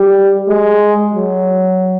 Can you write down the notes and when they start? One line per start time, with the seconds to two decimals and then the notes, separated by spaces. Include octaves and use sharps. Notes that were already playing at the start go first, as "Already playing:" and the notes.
Already playing: G3
0.48 G#3
1.14 F#3